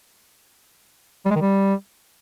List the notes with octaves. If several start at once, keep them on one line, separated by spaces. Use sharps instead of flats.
G3
G#3
D#3
G3